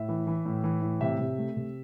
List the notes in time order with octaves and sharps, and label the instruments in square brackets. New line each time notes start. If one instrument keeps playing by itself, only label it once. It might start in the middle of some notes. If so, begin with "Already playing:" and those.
Already playing: [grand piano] A2 E5
E3
E3
A2
E3
A2
C3 E5
C3
A3
C3